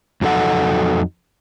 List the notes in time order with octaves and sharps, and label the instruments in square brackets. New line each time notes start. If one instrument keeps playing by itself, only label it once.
[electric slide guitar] F2 F#3 D#4 A4 F#5